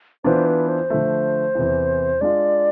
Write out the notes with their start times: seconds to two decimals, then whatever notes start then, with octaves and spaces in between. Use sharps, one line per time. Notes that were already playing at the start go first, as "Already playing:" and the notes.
0.24 E3 B3 D4 F4 C5
0.46 B4
0.68 C5
0.90 D3 F3 A3
1.55 E2 C3 E3
2.21 G#3 D4 F4 D5